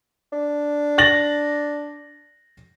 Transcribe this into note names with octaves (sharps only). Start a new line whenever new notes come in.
D4
A6 A#6 F#7